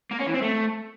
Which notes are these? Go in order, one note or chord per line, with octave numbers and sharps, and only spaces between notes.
A#3
C#4
E3
C4
A3